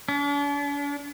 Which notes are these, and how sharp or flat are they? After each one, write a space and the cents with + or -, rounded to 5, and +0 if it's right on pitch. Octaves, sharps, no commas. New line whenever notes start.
D4 -45